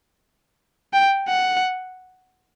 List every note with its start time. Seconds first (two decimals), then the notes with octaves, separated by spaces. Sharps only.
0.93 G5
1.28 F#5